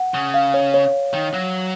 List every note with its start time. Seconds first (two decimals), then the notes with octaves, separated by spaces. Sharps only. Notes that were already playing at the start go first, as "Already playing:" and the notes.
Already playing: F#5
0.14 C#3
0.34 F5
0.54 C#5
0.74 C#5
1.13 D#3
1.34 F#3